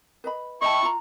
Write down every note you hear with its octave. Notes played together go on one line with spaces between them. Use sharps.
B4 D#5 B5
E4 D#5 G5 A5 C#6
F4 A#5